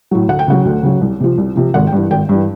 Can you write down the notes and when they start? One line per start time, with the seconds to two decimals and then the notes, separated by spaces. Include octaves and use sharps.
0.11 A2 F#3
0.28 D2 F#5
0.39 G5
0.48 C#3 F#3 F#5
0.65 D2
0.83 C#3 F#3
1.01 C2
1.20 C3 F3
1.38 C2
1.56 C3 F3
1.74 G#1 F#5
1.87 G5
1.92 G2 E3
2.11 G#1 G5
2.29 G2 E3